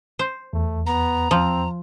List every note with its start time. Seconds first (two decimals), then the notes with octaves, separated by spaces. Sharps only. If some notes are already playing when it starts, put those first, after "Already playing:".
0.19 C5
0.53 E2 A3
0.86 B3 A#5
1.31 F3 C4